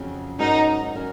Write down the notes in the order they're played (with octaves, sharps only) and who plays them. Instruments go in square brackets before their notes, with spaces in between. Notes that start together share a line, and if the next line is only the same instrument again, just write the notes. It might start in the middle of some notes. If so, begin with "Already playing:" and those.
Already playing: [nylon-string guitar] F2 C#3 F#3 C#4
[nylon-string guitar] G#2 F#3 C#4 F#4 A#4 [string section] D#4
[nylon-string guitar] F#3 C#4 F#4 A#4